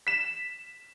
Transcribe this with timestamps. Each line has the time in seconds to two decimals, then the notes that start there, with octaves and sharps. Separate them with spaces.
0.07 B6 E7